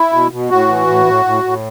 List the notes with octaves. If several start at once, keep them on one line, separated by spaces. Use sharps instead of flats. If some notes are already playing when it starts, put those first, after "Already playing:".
Already playing: E4
B2
B2
A2 F#4
E3
A2
A2
A2
A2